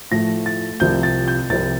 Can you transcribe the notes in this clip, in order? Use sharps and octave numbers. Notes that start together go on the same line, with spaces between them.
A2 F3 A3 A#6
A6
C2 C3 F3 C4 G6
A6
G6
C2 C3 F3 C4 A6